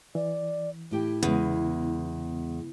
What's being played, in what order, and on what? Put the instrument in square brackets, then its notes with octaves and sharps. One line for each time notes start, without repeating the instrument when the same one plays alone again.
[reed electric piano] E3 [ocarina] D5
[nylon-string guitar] A2 G4 G5 [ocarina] E4
[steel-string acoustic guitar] E2 [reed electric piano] C#3 B3 [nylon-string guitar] G#3 G#4